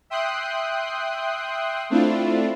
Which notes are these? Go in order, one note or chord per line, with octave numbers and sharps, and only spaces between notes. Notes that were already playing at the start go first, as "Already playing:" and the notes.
E5 G5 C6 D#6 F#6 C7
A3 C4 D4 E4 F4